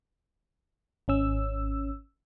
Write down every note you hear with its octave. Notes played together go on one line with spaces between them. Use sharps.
G#1 C#4 E6